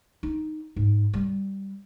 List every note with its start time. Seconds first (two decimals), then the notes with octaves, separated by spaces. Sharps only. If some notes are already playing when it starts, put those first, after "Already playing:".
0.23 D#4
0.76 G#2
1.13 G3